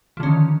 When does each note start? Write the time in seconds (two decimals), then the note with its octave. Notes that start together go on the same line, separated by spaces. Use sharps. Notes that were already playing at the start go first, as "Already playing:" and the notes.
0.17 F3
0.20 D3
0.23 C#4
0.26 D#3